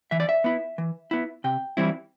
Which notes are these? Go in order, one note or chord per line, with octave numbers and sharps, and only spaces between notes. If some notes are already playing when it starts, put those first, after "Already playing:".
E3 E5
D5
E5
B3 E4
E3
B3 E4
C3 G5
E3 G3 C4 E4